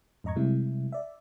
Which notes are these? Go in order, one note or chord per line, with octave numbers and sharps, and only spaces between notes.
F2 G#2 D#5 A#5 C#6 G#6
C3 G3 G#3 E4
D5 E5